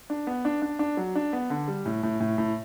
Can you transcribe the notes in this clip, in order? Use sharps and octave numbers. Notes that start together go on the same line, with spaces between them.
D4
B3
D4
D4
D4
F#3
D4
B3
D3
G3
A2
A2
A2
A2